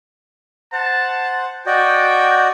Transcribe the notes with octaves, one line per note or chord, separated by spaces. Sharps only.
C5 F#5 A5
F#4 D5 D#5 G5